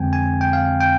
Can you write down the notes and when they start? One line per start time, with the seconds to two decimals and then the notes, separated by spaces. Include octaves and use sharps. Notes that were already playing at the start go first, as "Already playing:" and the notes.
Already playing: F2 D3 G#3 C4 G5 G#5
0.13 G#5
0.41 G5
0.53 F5
0.81 G5